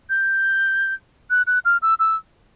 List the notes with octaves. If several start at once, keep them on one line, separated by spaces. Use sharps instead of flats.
G6
F#6
F#6
F6
E6
E6